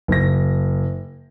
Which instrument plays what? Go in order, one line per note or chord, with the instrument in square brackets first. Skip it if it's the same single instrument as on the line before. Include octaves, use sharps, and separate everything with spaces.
[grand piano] F#1 A#6